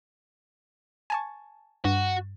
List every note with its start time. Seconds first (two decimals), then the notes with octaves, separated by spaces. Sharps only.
1.10 G#5 A5 C#6
1.85 G2 F#4